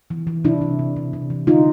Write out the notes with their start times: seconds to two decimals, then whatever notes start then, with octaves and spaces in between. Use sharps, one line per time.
0.10 E3
0.27 E3
0.44 C3 D4 E4
0.62 C3
0.79 C3
0.96 C3
1.13 C3
1.30 E3
1.47 D3 D#4 F4